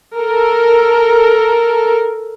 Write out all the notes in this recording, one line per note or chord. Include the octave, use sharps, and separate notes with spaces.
A4 A#4